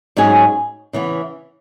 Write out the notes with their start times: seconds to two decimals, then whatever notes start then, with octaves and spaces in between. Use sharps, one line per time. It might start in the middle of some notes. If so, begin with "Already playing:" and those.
0.17 G#2 F#3 C#4 G#4
0.93 C#3 E3 B3